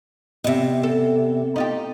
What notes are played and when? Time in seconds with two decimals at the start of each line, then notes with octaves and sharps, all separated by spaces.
0.44 E2 C3 D#5 E5
0.83 A4
1.56 D#4 F4 G4